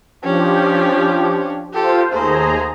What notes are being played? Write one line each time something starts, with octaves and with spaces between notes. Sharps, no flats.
F3 C#4 D4 G4
F4 G4 A4 C5
D#2 A3 G#4 C5 A#5